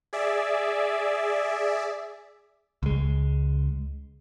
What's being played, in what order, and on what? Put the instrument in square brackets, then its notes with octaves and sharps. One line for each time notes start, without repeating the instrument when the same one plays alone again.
[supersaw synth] G#4 D5 E5
[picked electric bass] C#2 G#3